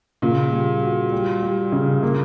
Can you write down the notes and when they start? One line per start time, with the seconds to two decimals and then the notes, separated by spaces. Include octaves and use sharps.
0.22 A#2 C#3
0.52 G3
0.83 F#4
1.12 G3
1.42 G3
1.72 C#3
2.03 A#3